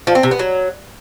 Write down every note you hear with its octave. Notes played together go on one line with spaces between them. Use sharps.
F3
C4
C3
B3
F#3